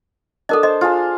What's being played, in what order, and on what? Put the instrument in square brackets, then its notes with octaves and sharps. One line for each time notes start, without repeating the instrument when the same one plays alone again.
[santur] D4 A5 [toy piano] A4 A#4 D#5
[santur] C5 [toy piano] D#5
[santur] F4 G#4 A5